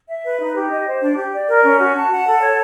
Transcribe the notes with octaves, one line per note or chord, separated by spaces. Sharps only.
E5
B4
D#4
G4
D#5
C5
D4
G4
D5
A#4
C#4
F#4
A5
F#5
A4
C#5